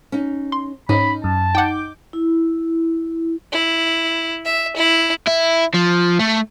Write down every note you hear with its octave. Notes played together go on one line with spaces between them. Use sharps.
C#4 D#4
C6
G#2 C#4 D#4 D#5 B5
F#2 A5
D#4 F#5 G5 D6 G6
E4
E4
E5
E4
E4
F3
A3